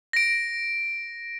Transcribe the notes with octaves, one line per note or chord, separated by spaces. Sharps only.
A#6 D7